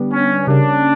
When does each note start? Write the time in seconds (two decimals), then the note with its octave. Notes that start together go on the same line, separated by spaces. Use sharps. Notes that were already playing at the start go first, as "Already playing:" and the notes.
Already playing: D3 G3 B3 D4 G4
0.13 C#4
0.47 C#3 G3 A#3 C#4 D4